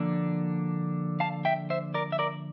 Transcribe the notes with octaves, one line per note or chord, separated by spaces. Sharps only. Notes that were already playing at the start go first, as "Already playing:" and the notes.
Already playing: D3 F3 A#3 D4
F5 A5
E5 G5
C5 E5
A#4 D5
E5
A#4 D5